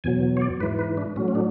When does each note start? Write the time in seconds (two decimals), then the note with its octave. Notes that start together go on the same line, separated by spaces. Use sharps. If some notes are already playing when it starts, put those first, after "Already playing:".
0.04 E2 B2 F#3 G#5
0.37 C#5
0.41 D5
0.60 G#2 E3 B4
0.79 B4
0.97 D4
1.16 A2 F#3 C#4
1.28 C#4
1.35 D4